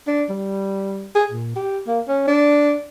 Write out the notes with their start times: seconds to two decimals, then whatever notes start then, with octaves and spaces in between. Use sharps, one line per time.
0.07 D4
0.29 G3
1.15 G#4
1.31 A#2
1.56 G4
1.87 A#3
2.08 C#4
2.28 D4